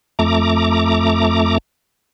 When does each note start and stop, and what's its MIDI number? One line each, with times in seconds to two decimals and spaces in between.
0.19 1.58 41
0.19 1.58 57
0.19 1.58 82
0.19 1.58 86